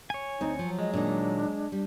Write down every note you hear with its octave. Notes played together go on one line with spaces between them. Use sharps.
C#5 G#5
D2 C4 D#4
F3 F#3
G#3 D#5
A#2 D#3 D4
G3